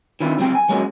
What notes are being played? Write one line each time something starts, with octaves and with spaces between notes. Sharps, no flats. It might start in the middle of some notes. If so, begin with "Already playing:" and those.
D#3 E3 C4 D4 E4 F4
C#2 F#3 C4 F#4 G4 G5
G#5
F#3 G#3 A#3 C#4 F#4